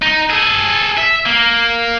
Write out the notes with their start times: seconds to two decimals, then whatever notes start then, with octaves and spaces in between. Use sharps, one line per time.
0.02 D#4
0.30 G#4 A4
0.98 E5
1.26 A#3